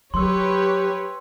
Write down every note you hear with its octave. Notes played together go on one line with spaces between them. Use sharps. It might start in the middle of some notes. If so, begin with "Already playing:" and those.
F#3 G4 B4 C#5 C6 E6